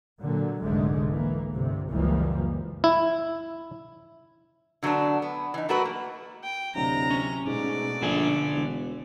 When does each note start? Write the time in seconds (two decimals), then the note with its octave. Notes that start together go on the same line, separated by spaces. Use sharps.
0.21 A#2 D3 F#3
0.61 F1 C2 G#2 D3 G#3 A3
1.12 E3 A#3
1.53 G1 C3
1.91 F#1 C#2 E3 F3 G3 A#3
2.84 E4
4.83 D3 F#3 A3 B3 D4
5.22 B3
5.54 E3 D#4
5.69 F#3 A3 D4 F#4 A#4 B4
5.85 A#3
6.43 G5
6.75 D1 C3 A#5
7.10 C#4
7.47 G#2 B2 A3 D5
8.02 A#1 D3 A4 G#5
8.54 E1